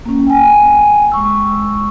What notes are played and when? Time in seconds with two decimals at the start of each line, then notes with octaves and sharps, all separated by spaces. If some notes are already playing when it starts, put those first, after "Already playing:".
0.05 A#3 C#4
0.27 G5 G#5
1.12 G#3 C#6 E6